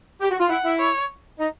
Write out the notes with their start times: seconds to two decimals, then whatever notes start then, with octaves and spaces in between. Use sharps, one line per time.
0.21 G4
0.31 F#4
0.40 F4
0.50 E4 F#5
0.65 E4
0.79 C#5
1.39 D#4